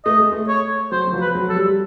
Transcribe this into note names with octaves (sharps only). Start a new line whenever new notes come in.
A3 D#5
G#3
A3
C#5
F#3 C5
F#3
F3
B4
F#3
A4
G3